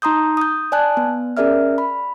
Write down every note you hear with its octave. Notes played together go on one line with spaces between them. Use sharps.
D#4 A#5 C6 D#6 G6
D#6 G6
D5 G#5 A5 F#6
B3
C#4 G#4 A#4 D5 E5 F6
B5